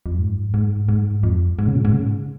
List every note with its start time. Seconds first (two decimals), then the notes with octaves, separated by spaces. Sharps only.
0.06 F2
0.18 G#2
0.54 G#2
0.89 G#2
1.23 F2
1.59 G#2
1.67 C#3
1.75 A#2
1.85 G#2
1.93 C#3